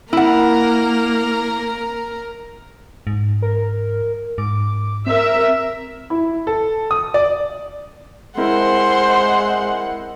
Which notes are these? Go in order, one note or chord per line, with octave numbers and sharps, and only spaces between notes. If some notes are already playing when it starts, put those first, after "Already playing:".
A#3 E4 A#4 F#5
G#2
A#4
G#2 D6
C4 A#4 E5
E4
A4
D#6
D5
G#3 C4 E4 A#4 C5 F#5